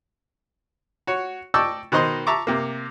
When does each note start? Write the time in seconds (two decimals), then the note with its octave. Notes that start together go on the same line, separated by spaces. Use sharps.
1.07 F#4 C#5
1.54 D5 D#5 G5 A5 C#6 E6
1.92 B2 D#3 C5 D#5 C6
2.27 E5 A5 A#5 C#6 D6
2.47 C3 A#3